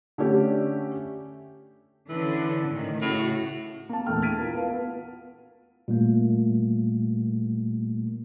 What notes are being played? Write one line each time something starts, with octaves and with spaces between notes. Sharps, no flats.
D3 A3 C#4 G4
D3 E3 C#4
A2 D#3
A2 C#3 F#4
A#3 A5
A#1 E2 A3 G5 F6
F6 G#6 A6 B6 D7 D#7
E4 F4 A#4 A5
B3 F5
B3 F4
A#2 G3 A3 A#3